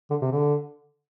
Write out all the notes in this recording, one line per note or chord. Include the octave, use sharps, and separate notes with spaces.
D3
C3
D3